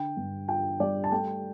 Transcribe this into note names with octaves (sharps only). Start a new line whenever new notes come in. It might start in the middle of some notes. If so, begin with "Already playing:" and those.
Already playing: D3 G5
G2
F4 G5
G3 D5
A5
A3 G5